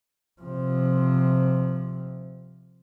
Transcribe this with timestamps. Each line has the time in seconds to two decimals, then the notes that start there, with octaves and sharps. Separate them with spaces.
0.42 C3 F3